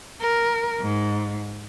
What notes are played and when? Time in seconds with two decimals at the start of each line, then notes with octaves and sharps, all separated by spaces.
0.21 A#4
0.80 G#2